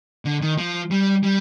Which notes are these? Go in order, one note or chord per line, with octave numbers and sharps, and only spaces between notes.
D3
D#3
F3
G3
G3